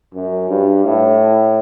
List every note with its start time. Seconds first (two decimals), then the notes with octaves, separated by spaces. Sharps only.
0.15 F#2
0.50 G2
0.85 A2